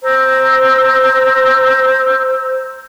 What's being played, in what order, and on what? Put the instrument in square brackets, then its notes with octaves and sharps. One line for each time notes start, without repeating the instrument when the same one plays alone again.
[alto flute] C5 [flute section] A#5 E6